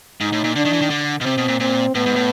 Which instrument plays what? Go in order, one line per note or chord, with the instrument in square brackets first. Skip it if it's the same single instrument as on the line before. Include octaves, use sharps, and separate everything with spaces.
[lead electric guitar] G#2 [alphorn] D#4
[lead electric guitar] A2
A#2
[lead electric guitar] D3 [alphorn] D4
[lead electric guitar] D#3
E3
D#3
D3
B2
[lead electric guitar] C3 [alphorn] C4
[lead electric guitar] B2
A#2
[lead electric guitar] A#2 [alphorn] C4
[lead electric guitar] A2 [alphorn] B3
[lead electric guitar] G#2
A2